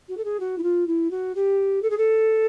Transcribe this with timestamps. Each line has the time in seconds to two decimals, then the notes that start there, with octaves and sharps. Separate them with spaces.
0.08 F#4
0.17 A4
0.24 G#4
0.39 F#4
0.58 E4
0.63 F4
0.87 E4
1.10 F#4
1.35 G4
1.82 A4
1.90 G#4
1.97 A4